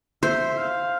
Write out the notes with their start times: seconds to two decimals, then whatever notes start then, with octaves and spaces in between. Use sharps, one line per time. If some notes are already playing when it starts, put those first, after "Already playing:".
0.23 C5 E5
0.58 F5